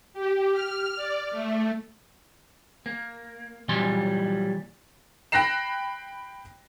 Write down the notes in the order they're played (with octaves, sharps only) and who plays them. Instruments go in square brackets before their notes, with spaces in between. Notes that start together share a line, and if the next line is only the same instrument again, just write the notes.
[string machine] G4
F6
D5
A3
[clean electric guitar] A#3
A#2 E3 F#3 G3 C6
[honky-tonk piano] G5 B5 F#6 A#6 C7 E7